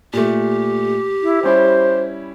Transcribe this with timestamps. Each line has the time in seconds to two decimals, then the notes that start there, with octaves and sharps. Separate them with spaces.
0.13 A#2 A3 G4
1.23 E4
1.43 G3 C#4 E4 C5